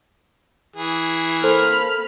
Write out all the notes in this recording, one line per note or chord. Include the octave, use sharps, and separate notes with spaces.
E3 G#4
A#3 A4 C5 B5 F6